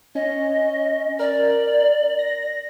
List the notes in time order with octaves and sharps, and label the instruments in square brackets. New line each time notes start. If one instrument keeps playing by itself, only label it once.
[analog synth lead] C#4 [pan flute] D#5
[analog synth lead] A#4 [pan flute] D5
[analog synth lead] A#6